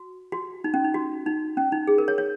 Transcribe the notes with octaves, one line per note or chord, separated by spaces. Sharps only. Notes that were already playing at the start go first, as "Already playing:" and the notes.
Already playing: F#4
F#4
D#4
C#4
D#4
F#4
D#4
C#4
D#4
G#4
A#4
C#5
C#5